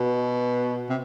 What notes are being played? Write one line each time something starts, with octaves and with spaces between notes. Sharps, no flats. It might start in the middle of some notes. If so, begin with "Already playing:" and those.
Already playing: B2
C3